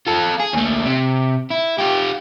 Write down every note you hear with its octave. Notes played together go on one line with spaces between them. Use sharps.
F4 A4
G#4
D#2 A3
C3
E4
F4 G4